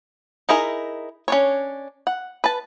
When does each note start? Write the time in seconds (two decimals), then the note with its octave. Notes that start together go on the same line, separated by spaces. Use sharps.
0.49 D#4 E4 G#4 A#4
1.28 C#4 D4 C#5
2.07 F#5
2.44 B4 A5